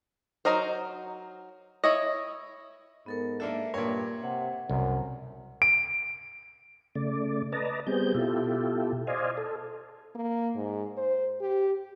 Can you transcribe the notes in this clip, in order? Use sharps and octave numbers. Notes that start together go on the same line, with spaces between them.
F#3 D#4 A#4 C5
E4 C#5 D#5
G#2 B3 A4 A#4
A#3 D4 A4 E5
G2 A#2 A#4 C#5
C3 F#5
C2 F#2
D7
C#3 A3 D5
B4 D5 D#5 A5 A#5
G3 B3 C4 G#4 G6
B2 E4 F4 G4 A4
C5 D5 D#5 F5 G#5
A4
A#3
G#2
C5
G4